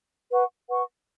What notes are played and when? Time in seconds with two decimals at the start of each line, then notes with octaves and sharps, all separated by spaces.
0.30 B4 F#5 C#6
0.68 B4 F#5 C#6